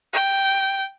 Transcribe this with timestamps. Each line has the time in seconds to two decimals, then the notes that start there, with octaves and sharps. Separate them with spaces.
0.13 G5